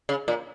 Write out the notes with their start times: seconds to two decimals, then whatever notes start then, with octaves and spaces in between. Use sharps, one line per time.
0.09 C#3
0.28 A#2